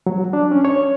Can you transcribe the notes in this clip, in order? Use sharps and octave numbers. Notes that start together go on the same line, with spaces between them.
F#3
D4
C#4
C#5